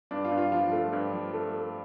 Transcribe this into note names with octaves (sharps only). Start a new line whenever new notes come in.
G2 D4
F4
G2
F4
F3 F4
A3 F4
G2
F3
A3
A3